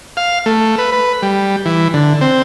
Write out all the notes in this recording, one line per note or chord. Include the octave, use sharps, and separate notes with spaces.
F5
A3
B4
B4
G3
E3
D3
C4